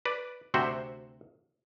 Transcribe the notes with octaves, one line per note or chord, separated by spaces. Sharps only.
B4 D5
D2 C3 C4 F#4 C5 E5